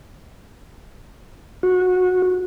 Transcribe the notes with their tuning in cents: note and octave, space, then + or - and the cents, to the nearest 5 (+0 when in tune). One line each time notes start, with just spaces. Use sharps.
F#4 -20